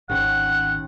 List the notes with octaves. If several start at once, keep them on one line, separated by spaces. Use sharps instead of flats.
G#1 D#2 C#4 F#5 G5